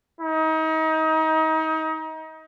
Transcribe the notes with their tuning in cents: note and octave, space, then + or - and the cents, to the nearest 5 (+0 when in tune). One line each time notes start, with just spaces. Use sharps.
D#4 +30